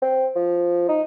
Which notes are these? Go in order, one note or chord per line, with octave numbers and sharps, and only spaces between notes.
C4
F3
D#4